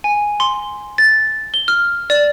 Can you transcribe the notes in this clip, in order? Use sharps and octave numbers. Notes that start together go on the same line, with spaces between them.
G#5
C6
A6
G7
F6
D5